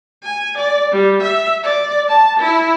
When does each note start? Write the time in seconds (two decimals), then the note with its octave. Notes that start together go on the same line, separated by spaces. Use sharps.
0.23 G#5
0.57 D5
0.91 G3
1.22 E5
1.63 D5
2.08 A5
2.39 E4